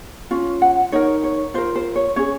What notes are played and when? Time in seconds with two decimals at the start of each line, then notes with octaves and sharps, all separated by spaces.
0.31 C#4 F4
0.62 F#5
0.92 D#4 A#4 C#5
1.24 C#5
1.54 F4 A#4 C5
1.76 C5
1.96 C#5
2.16 C#4 G#4 C#5